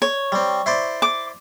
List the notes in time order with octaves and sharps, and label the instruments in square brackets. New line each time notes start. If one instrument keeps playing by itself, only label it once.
[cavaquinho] C#5
[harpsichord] G3 C4
E4 C5 D5
[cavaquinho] D6